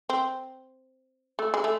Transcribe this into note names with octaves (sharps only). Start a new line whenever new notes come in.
C4
A3
G#3
A3